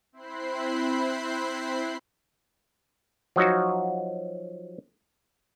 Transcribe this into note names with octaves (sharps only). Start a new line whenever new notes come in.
C4 E4 C5 B5 F#6 C7
F3 F#3 D#4 F#4